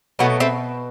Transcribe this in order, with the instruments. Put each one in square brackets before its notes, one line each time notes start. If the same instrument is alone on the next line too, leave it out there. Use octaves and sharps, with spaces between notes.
[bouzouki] B2 F#3 A3 B3
A3 C4